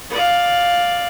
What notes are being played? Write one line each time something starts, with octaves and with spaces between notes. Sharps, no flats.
D5 F5